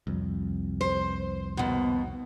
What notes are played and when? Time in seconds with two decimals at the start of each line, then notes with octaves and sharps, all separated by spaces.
0.07 C2 F2
0.81 C5
1.57 D#2 B2